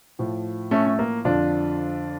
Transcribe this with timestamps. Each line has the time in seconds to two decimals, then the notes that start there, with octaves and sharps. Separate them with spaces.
0.19 A2 F3
0.71 A3 C#4
0.87 A3
0.99 A#3
1.25 F2 D3 F3 D4 F4